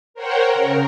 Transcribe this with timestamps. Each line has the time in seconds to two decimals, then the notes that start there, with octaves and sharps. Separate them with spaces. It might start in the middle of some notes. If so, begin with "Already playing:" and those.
0.14 A#4 C5 C#5 F#5 G5
0.51 C#3 A#4